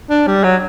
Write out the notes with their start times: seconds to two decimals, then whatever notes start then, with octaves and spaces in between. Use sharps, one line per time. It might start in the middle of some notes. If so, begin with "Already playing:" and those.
0.10 D4
0.27 G3
0.44 F#3